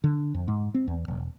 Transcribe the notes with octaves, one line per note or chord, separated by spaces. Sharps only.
D3
F2
G#2
C4
E2
E1